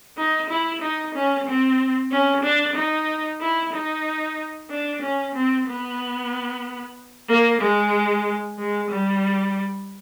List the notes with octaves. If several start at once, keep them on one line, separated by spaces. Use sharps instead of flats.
D#4
E4
D#4
C#4
C4
C#4
D4
D#4
E4
D#4
D4
C#4
C4
B3
A#3
G#3
G#3
G3